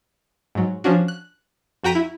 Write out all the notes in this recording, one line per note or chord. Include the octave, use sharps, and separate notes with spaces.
G#2 F#3
F3 C#4 D4 F#4
F#6
F2 F#4 G5 A#5 B6 D#7
E4